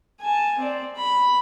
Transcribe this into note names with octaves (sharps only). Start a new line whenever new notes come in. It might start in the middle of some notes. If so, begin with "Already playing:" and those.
G#5 A5
C4 D5
B5